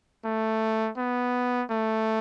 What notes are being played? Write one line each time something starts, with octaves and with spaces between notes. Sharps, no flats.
A3
B3
A3